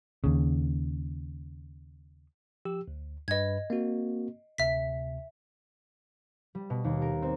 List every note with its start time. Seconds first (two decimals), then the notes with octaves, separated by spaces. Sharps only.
0.24 D#2 C#3
2.65 F3 G4 E6
2.88 D2
3.28 G2 B4 D#5 G#6
3.70 A#3 C4 F#4
4.58 D2 C3 E5 B6
6.55 G3
6.70 B2
6.84 D#2
7.02 A#4
7.22 C4